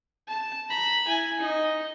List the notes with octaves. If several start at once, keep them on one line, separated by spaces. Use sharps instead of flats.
A5
A#5 B5
E4 G#5
D#4 D#5